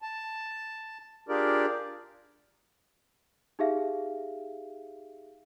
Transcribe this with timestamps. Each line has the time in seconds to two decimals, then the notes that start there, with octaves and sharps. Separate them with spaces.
0.02 A5
1.29 D4 F4 G4 G#4 A#4 D5
3.59 D#4 G4 G#4 E5 F5